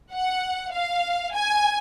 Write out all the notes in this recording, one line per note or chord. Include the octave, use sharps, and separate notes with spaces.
F#5
F5
G#5